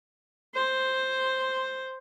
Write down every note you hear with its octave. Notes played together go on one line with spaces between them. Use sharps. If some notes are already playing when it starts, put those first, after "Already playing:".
C5